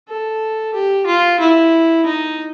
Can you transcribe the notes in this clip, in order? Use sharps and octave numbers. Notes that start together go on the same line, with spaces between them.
A4
G4
F4
E4
D#4